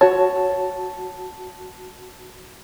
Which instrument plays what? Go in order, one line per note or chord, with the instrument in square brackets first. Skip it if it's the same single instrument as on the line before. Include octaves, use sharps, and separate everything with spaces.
[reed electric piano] F#4 A5 [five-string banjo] C#5